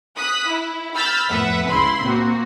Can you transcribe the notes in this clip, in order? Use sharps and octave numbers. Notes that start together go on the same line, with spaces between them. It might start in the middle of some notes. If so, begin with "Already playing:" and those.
D#6 F#6 B6
E4
B5 E6 F6 G6 A6 B6
F2 A2 B3 B4 E5 F#5
C#2 C#3 E4 B5 C6
A#2 A#3 C4 F#4